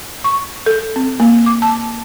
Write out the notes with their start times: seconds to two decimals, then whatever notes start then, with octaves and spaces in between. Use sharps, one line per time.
0.24 C#6
0.66 A4
0.96 C4
1.20 A#3
1.46 D6
1.62 A5